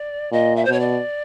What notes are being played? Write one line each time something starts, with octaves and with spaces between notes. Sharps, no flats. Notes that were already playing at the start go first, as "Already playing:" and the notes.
Already playing: D5
A#2 D#5
E5
C5
B2 C#5
D5